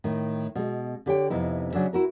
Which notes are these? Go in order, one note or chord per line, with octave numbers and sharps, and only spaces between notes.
A2 D#3
B2 G#3
D3 G4 C#5 G5
F2 C3 B3 D#4 E4
C#3 F#3 D4 E5
E4 F#4 A#4